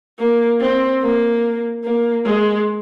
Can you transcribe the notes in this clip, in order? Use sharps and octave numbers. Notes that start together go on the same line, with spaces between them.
A#3
C4
A#3
A#3
G#3